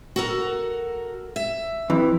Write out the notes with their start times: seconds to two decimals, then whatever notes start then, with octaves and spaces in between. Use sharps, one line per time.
0.16 F#4 A4 A#4
1.36 E5
1.90 F2 E3